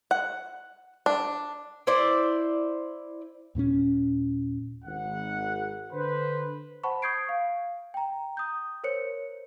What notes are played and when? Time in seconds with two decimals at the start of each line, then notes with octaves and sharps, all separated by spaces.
0.11 F#5
1.06 D4
1.87 E4 C5 D5
3.55 D#2 A#2 A#3 C#4
4.85 G#1 F#5
5.92 D3 B4 C5
6.83 C5 F#5 A5 B5 C#6
7.02 C#6 D#6 G6 G#6 C7 D7
7.29 F5
7.94 G5 A#5
8.37 D#6 G6
8.84 A#4 C5 C#5 C#7